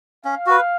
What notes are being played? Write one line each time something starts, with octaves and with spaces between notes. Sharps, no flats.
C#4 F5
F#4 B4